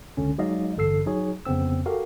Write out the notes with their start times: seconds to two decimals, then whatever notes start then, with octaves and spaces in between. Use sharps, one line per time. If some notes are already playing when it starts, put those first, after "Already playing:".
0.17 C#2 D3 C#4
0.38 F#3 G#3 D#4 D5 D#5 F5
0.77 A1 G2 D3 A4 E6 C7
1.06 F#3 D#4 G#4 C#5
1.46 F2 C#3 B3 C4 E6
1.86 F#4 G4 A4 A#4 F5